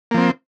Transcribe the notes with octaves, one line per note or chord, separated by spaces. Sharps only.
F3 A#3 C4